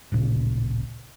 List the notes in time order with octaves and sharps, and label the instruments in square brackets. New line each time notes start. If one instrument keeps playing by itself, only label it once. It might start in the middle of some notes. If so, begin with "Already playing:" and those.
[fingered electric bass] D1 A1 A#2 C#3